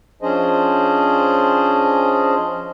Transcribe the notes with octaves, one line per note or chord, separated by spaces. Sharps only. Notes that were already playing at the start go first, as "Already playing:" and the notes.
F3 C#4 D4 G#4 C5 D#5